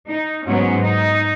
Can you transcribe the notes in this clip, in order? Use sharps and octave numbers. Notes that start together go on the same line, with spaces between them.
D#4
G#2 F#3 B3 C#4
D#4